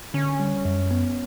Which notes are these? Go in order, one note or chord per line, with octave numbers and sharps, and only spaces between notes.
D3 C#4
G3
F#2
B3